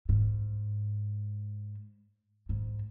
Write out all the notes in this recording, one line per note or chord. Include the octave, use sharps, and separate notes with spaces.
G#2
G#2